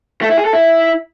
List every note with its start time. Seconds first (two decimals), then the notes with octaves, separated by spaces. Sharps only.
0.22 A3
0.29 E4
0.37 G#4
0.45 A4
0.53 E4